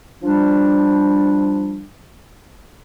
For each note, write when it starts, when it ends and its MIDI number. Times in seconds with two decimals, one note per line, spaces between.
0.23 1.83 53
0.23 1.83 55
0.23 1.83 62